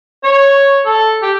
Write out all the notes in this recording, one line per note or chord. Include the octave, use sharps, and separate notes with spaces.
C#5
A4
G4